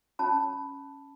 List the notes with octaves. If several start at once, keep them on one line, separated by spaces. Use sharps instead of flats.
C#4 A5 B5